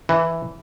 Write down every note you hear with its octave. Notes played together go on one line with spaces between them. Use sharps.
E3